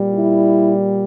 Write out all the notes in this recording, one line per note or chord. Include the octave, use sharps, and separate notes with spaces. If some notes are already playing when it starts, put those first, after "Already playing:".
Already playing: A#2 G3
E4